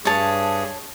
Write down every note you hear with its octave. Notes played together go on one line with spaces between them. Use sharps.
G2 G#4 C#5 A5